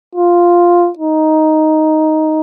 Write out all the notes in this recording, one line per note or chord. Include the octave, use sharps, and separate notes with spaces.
F4
D#4